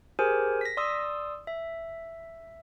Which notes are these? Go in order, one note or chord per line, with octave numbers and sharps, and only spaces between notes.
G4 G#4 A#4 C5 G#5
A#6 B6
D5 C6 D#6 E6
E5